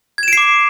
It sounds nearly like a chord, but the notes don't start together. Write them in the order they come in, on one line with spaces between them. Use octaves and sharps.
G#6 E7 D7 C7 D6